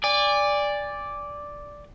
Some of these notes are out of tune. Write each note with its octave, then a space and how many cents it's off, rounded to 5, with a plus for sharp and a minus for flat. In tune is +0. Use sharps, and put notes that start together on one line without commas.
D5 -5 G#5 -30